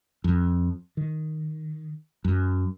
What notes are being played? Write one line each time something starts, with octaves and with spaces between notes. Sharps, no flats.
F2
D#3
F#2